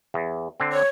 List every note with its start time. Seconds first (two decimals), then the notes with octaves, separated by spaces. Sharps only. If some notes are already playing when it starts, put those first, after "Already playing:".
0.14 E2
0.60 D3 C4
0.73 C#5